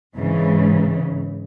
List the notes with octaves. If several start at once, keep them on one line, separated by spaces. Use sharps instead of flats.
G#1 G#2 C#3 E3